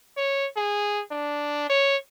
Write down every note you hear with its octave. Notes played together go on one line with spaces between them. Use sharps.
C#5
G#4
D4
C#5